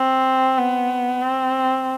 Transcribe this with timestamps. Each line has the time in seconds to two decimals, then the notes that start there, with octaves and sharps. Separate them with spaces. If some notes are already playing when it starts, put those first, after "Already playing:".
Already playing: C4
0.58 B3
1.22 C4